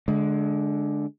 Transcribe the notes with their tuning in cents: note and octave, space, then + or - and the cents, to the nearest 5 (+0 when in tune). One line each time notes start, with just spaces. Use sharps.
D3 +0 G#3 +25